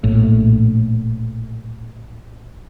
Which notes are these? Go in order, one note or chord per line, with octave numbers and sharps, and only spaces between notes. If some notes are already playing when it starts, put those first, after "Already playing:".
A#1 A2